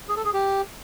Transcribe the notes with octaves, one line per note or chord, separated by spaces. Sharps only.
G#4
A4
G#4
G4